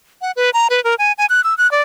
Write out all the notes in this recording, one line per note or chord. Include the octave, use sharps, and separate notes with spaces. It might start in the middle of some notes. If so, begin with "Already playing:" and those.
F#5
B4
A#5
B4
A#4
G#5
G#5
F#6
E6
F#6
D5